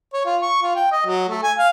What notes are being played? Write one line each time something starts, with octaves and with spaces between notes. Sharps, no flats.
C#5
F4
C#6
F4
G5
D#5
F#3
A3
G#5
F5